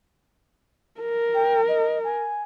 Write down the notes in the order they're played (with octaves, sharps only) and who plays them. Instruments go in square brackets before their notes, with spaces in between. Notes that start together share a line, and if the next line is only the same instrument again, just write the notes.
[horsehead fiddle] A#4
[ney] G5
D#5
G#5